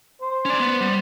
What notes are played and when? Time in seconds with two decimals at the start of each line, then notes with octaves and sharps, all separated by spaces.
0.22 C5
0.45 C#4 D5
0.60 B3
0.81 G3